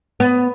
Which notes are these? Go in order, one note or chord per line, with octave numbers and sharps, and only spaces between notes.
B3